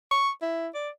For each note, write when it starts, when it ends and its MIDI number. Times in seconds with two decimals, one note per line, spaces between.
0.11 0.30 85
0.42 0.68 64
0.74 0.90 74